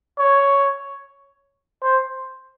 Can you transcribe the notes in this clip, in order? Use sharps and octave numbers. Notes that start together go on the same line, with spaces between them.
C#5
C5